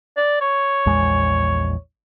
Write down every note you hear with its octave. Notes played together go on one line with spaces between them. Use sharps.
D5
C#5
A#1 E2 G#3